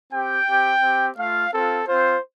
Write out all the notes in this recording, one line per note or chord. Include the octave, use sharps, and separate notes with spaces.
C4 G4 G5
C4 G4
C4 G4
A3 F4 F5
C4 F4 A4
C4 F4 C5